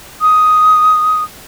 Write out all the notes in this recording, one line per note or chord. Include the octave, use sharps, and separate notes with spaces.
D#6